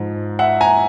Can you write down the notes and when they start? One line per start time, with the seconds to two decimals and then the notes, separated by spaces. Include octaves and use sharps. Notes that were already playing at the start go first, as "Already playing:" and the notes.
Already playing: G#2 F3
0.39 E5 F#5
0.61 G#5 A#5